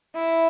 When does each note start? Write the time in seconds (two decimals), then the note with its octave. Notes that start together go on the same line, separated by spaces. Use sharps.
0.16 E4